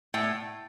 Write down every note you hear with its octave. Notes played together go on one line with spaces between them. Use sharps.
A2 G5